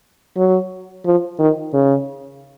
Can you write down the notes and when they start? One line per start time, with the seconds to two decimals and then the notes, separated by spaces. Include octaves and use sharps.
0.36 F#3
1.05 F3
1.39 D#3
1.74 C#3